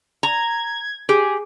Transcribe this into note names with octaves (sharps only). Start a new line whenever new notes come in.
A#5 G#6
G4 G#4